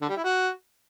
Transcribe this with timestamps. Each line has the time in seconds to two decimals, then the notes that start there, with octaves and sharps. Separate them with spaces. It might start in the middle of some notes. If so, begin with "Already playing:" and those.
0.02 D3
0.09 G3
0.16 E4
0.24 F#4